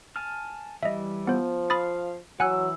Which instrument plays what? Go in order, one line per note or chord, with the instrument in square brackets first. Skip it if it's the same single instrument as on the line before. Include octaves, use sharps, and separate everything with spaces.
[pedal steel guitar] G#5 A5 F6
[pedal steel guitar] E3 G3 [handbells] D#5 E5
[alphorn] F3 [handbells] B3 C5
[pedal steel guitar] F5 [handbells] B5 D#6 A6
[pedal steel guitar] E3 E6 [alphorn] F#3 [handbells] F#5 G#5 F#6